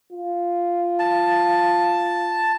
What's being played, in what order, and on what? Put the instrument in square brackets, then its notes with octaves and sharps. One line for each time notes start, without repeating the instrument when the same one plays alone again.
[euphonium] F4
[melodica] A5